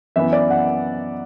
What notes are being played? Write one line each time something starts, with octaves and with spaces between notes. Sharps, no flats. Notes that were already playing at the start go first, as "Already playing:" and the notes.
F#2 E3 B3 E5
D5
F#5